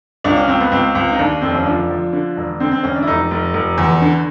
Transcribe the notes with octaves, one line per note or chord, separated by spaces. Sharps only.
C#2 D4
C#4
C#2 C4
B3
C#2 C4
C#2
D#4
D#2 D4
F1 C4
C#4
F3 D4
F3
D3
E1
D3 C4
C4
E1 C#4
D4
E4
F1 D#4
F1
F1
E2
D3